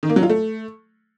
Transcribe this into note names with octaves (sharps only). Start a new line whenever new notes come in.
D#3
A#3
F#3
F4
A3